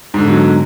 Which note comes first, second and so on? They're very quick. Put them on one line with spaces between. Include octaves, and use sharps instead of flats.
G#2 D3 B2 F#3